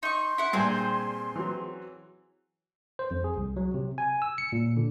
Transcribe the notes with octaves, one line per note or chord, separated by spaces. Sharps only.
D#4 C6 C#6
E4 F#5
G2 A#2 C4 G#4 C5 G#5
E3 F#3
C5
F2
G#4
C2
F#3
C3
G#5
E6
C#7
A#2
D3